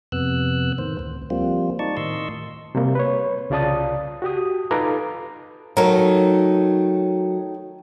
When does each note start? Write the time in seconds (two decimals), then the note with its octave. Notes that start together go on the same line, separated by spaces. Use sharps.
0.12 F2 C3 B3 E6 F#6
0.78 A2 D#3 C5
0.99 D2
1.30 F3 G3 A#3 C4 F4
1.79 D#4 D5 A5 C#6
1.97 A2 D#3 D#5 C6 C#6 E6
2.75 C3 G3 A#3
2.95 B4 C#5
3.50 C2 C#3 F4 D5 A5 D#6
4.22 F#4 G4 D#6
4.71 D#4 F4 A4 B4 A#5 D6
5.77 D#3 F#3 A3 D#4 A#4